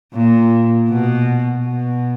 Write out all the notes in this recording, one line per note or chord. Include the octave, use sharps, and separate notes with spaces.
A#2
B2
B2